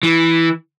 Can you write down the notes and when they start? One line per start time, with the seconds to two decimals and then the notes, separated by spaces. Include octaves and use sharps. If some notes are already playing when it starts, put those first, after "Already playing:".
0.03 E3